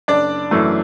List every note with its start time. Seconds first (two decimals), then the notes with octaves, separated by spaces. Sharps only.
0.08 F#1 D4 D5
0.51 F#2 E3 A3